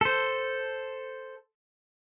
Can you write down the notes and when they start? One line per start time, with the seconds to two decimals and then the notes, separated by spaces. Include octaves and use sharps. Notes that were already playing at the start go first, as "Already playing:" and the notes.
0.01 A4 C5